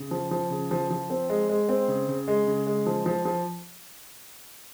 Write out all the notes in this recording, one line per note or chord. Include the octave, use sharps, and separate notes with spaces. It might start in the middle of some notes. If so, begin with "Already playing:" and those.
Already playing: C#3
F3
F3
C#3
F3
F3
C4
G#3
G#3
C4
C#3
C#3
G#3
C#3
G#3
F3
F3
F3